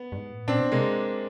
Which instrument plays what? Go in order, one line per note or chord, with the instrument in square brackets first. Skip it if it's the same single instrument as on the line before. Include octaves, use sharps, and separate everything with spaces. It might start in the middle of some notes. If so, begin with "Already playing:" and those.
Already playing: [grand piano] B3
[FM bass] G2
G#2
A2
[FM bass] A#2 [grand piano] C4 D4
[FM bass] B2
[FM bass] C3 [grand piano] G#3 A#3